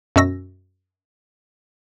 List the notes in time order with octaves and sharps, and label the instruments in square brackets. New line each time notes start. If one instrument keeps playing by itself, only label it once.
[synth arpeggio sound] F#2 B2 F#4 E6 A#6